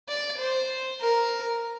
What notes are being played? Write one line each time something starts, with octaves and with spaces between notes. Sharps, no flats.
D5
C5
A#4